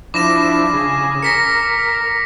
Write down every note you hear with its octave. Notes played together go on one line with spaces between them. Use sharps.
F3 D4 E4 D6 A#6 E7
C#3 G#4
A#4 A#6 B6 C#7